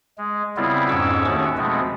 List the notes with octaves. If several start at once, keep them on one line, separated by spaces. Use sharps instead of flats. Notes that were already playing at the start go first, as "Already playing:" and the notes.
G#3
C#3 G3 B3 C4 E4 F4
F2 G#2 C#4 C#6 D6 E6
D#2 D#3 A3 C#4 F#4 F#5
B2 F3 G#3 A3 C4